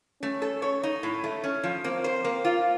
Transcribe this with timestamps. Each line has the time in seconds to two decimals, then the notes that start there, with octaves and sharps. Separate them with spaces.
0.21 A3 C#4
0.42 A4
0.62 C#5
0.83 D#4
1.03 A2
1.24 A3
1.44 C#4
1.64 F3
1.84 A#3 C4
2.04 C5
2.24 A#3
2.45 F4